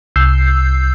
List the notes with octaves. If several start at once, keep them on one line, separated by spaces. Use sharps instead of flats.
C2 E6 G6 C7